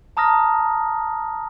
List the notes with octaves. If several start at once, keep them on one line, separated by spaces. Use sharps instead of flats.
A5 A#5 D#6 F6 A#6